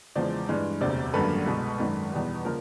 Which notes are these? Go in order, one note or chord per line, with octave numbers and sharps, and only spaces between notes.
E2 C#3 F3 G#3 C5 D5
G2 E3 G#3
E1 D2 C3 C5 D5
G#1 F#2 D3 G3 A#3 A4 B4
C2 B2 G#3
G#1 F#2 D#3
E2 B2 G3 B3
C#3 F3 A#3 A#4